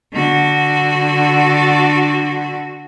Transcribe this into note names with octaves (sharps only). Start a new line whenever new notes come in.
D3 F#4